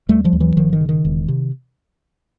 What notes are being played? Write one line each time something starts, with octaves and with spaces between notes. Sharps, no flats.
D#2 G3 A3
F3 G3
D#2
E3 F#3
G1 D#3 F3
D#3
C#3
D#3
E1
C3